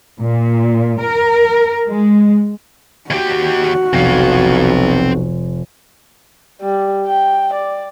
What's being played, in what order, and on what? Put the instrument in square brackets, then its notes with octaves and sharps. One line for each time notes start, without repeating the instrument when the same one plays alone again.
[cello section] A#2
A#4
G#3
[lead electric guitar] D#2 G4 [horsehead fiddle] F#4
[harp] F1 [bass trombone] B1 [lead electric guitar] C4 F5
[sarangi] G3
G5
D5